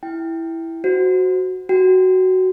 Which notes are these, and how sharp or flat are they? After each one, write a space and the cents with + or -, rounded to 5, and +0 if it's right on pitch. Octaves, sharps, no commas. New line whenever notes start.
E4 +0 G5 +0
F#4 +0 C5 -10
F#4 +10 G5 +0